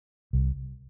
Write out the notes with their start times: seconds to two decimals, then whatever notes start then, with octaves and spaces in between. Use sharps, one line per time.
0.33 C2